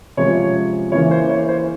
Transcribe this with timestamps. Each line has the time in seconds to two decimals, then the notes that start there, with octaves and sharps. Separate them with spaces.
0.17 C3 F3 G#3 C#4 C#5
0.92 C#3 E3 A#3 C#4 C#5
1.11 C5
1.29 C#5
1.49 C5